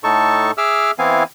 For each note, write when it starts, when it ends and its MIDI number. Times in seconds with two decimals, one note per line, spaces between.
0.04 0.51 45
0.04 0.51 63
0.04 0.51 69
0.04 0.51 81
0.04 0.51 85
0.58 0.91 68
0.58 0.91 76
0.58 0.91 86
0.58 0.91 88
0.58 0.91 89
0.99 1.23 52
0.99 1.23 59
0.99 1.23 60
0.99 1.23 64
0.99 1.23 77
0.99 1.23 80